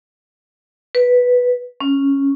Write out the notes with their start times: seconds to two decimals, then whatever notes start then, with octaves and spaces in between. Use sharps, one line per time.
0.95 B4
1.81 C#4